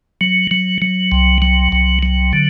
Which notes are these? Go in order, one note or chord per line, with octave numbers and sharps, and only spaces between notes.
F#3
F#3
F#3
C2
F#3
C2
F#3
D3